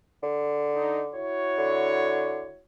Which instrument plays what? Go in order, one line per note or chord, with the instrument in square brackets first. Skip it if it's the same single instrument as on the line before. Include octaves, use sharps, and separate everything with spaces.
[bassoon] D3
[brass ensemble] D#4
E4 F#4 C#5
[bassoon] D3